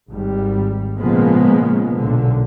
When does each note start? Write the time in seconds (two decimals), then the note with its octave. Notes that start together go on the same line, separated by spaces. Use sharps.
0.10 G#1 G3
0.99 A#2 C#3 F3 G#3 A#3 B3
1.97 B1 A#2 D3